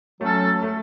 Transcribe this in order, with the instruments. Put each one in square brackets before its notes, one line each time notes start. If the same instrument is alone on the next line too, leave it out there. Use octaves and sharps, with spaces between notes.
[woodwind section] F#3 C#4 A4 [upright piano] A3
[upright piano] A3